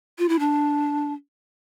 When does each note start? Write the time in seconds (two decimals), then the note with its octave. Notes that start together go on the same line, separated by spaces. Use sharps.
0.19 F4
0.29 E4
0.39 D4